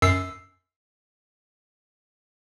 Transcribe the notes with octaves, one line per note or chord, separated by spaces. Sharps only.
F#2 E6 C7